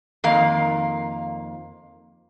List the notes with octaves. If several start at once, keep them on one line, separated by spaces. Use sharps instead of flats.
F2 D#3 A#3 F5